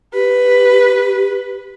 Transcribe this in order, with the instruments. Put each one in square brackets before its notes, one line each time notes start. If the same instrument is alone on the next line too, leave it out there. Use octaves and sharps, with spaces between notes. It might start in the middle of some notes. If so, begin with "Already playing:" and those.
[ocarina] G4 [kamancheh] B4